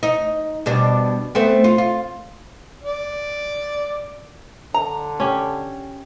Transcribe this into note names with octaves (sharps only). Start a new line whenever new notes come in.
D#4
B2 G3 D4
A3 B3 C4
F4
F4
D5
D3 A#5
C#4 G4